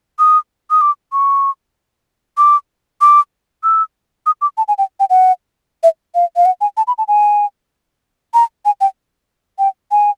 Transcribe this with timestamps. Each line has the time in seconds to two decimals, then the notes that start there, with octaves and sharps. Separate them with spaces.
0.19 D#6
0.71 D#6
0.81 D6
1.13 C#6
2.38 D6
3.01 D6
3.64 E6
4.26 D#6
4.41 D6
4.58 A5
4.68 G#5
4.78 G5
5.00 G5
5.10 F#5
5.83 E5
6.15 F5
6.36 F5
6.46 F#5
6.61 G#5
6.77 A5
6.87 B5
6.98 A5
7.08 G#5
8.34 A#5
8.65 G#5
8.81 G5
9.59 G5
9.91 G#5